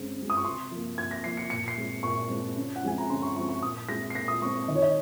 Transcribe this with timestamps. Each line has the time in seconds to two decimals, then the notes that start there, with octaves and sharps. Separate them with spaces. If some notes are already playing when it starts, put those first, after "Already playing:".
Already playing: C#3 G#3 C4
0.19 G#3 C4
0.30 D#6
0.37 C#6
0.45 C3 C6
0.71 F3 A#3
0.98 C3 G#6
1.11 A#6
1.24 F3 A#3 C7
1.37 C#7
1.50 A#2 C#7
1.68 C7
1.78 G#3 C4
2.03 A#2 C#6
2.30 G#3 C4
2.56 C#3
2.76 F#5
2.83 F3 G#3 C4 G#5
2.98 A#5
3.10 C#3 C6
3.22 C#6
3.36 F3 G#3 C4 C#6
3.49 C#6
3.63 A#2 D#6
3.89 G#3 C4 A#6
4.10 C7
4.15 A#2 A#6
4.28 D#6
4.41 G#3 C#6
4.45 C4
4.68 D#3 D#5
4.76 C#5
4.82 D#5